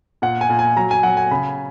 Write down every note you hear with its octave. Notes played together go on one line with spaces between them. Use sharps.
A#2 F#5
G#5
A#2
G#5
F#3 A#5
G#5
F#3 F#5
G#5
C#3 B5